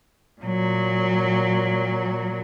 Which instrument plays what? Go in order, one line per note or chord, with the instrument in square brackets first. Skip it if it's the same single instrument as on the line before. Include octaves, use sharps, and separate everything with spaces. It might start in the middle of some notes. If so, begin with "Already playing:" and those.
[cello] A#2 F#3